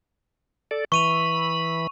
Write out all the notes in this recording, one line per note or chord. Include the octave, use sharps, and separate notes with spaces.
A4 D5
E3 B5 C#6 D#7 F7